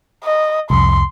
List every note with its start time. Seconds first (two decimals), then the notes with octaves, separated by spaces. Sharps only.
0.24 D#5
0.70 C2 F2 C6